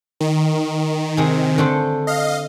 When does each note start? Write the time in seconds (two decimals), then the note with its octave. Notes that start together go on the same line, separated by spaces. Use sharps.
0.21 D#3
1.17 C3 G#4
1.58 D3 A3 C5
2.07 D#5 F5